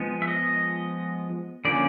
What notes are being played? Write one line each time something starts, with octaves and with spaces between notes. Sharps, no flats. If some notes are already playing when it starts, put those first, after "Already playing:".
Already playing: F3 G#3 B3
E5
D#5
D3 F3 A#3 C#4 D5